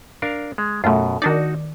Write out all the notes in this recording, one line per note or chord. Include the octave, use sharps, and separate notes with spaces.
D4 A#4 F5
G#3
F#2 B2 A3 F4
D#3 D4 D#4 F#4 D5